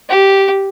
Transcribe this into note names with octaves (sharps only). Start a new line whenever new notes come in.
G4